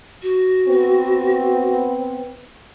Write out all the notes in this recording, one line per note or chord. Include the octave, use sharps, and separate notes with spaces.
F#4
B3 C4